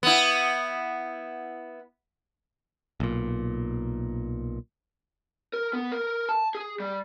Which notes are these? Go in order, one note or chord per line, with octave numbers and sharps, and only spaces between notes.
B3 E4
B1 A#2
A#4
B3
A#4
A5
G#4
G3